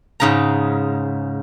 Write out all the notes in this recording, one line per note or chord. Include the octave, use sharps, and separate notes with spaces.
G#2 C#3 A#5